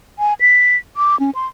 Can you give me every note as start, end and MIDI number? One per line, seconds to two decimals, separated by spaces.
0.19 0.34 80
0.41 0.77 95
0.97 1.18 86
1.20 1.30 61
1.35 1.47 84